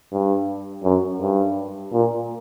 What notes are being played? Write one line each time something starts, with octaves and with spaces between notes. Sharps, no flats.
G2
F#2
G2
A#2